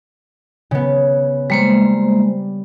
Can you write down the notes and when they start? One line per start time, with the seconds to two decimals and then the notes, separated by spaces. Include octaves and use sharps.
0.71 C#3 B3
1.50 G3 G#3 A#3 C5